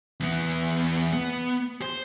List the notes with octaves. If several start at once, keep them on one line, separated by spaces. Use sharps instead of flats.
E2 B3
B3
C5